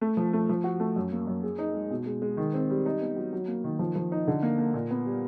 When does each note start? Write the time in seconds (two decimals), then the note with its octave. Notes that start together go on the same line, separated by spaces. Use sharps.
0.01 A3
0.17 F3
0.33 A3
0.49 F3
0.64 F#4
0.80 A3
0.96 F#2
1.12 A#3
1.27 F#2
1.43 G#4
1.58 D#4
1.74 G#3
1.90 B2
2.06 G#3
2.22 G#3
2.37 D#3
2.54 C4
2.70 G3
2.86 D#4
3.01 B3
3.16 F#3
3.33 F#3
3.48 A#3
3.64 D#3
3.79 F3
3.95 F3
4.12 D#4
4.28 D3
4.43 A#3
4.58 A#3
4.74 A#2
4.91 B3
5.06 G3